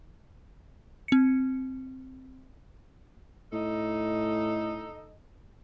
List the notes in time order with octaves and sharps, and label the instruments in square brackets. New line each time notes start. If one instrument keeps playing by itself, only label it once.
[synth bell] C4 C#7
[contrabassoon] A2 [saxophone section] D#4 A4 D#5